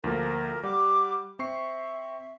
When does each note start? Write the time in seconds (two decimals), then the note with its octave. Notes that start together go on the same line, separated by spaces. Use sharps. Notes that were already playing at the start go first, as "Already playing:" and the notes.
0.04 D2 F3 A#3 A#4
0.63 G3 F#5 D6
1.39 C4 E5 C#6 C7